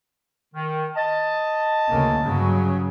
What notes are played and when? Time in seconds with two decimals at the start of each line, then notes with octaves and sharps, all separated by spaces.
0.54 D#3
0.96 D#5 A5
1.90 D2 C#3 A#3
2.24 G2 C#3 F#3